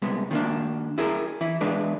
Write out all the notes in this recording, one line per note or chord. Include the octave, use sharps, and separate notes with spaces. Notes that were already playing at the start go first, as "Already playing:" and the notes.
C2 G#3 B3
D#3 A#3 D4
E4 G#4 A#4
E3 E4
E2 G#3 D4 B4 D5